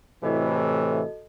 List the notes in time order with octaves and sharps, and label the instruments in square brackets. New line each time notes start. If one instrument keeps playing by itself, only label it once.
[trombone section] A2 C3 E3 [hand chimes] F#4 A4 D#5